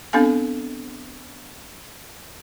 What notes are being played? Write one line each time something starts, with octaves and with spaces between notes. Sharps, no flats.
B3 C4 D4 A4 F5 G#5